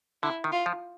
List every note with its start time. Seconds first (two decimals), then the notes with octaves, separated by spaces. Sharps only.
0.23 D3 E4
0.44 D#3
0.52 F4
0.66 F3